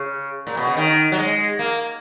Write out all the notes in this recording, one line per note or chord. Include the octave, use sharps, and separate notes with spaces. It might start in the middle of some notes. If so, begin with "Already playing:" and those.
Already playing: C#3
A#2
B2
C#3
D#3
F#3
G#3
A#3